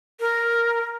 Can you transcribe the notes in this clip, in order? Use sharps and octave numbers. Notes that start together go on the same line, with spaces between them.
A#4